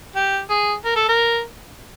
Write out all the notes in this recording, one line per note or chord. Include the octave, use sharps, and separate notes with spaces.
G4
G#4
A#4
A4
A#4